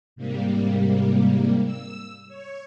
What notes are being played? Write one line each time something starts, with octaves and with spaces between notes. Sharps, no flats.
G#2 C3 G3 A#3
E6
C#5